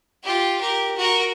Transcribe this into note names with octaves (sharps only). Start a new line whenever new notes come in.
F4 G4
G4 A#4
F#4 A#4